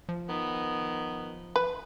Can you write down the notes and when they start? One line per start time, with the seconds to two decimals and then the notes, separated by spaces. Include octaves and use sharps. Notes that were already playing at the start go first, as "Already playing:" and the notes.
0.09 F3
0.28 D#3 B3
1.56 B4